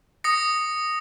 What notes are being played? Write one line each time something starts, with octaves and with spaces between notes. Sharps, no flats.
D#6 A#6 C#7